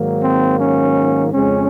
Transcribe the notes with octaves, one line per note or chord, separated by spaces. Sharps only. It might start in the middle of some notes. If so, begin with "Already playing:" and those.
Already playing: G#2 D#3 F#3 A#3
C4
C#4
F2 C#3 G#3 C4 C#4